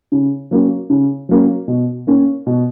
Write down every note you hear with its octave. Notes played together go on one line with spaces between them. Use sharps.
C#3
F#3 A#3 C#4
C#3
F#3 A#3 C#4
B2
A#3 C#4
B2